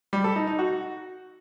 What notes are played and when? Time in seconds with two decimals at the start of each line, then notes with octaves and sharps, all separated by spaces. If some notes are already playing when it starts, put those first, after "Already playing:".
0.13 G3
0.24 A4
0.36 D#4
0.47 D#4
0.59 F#4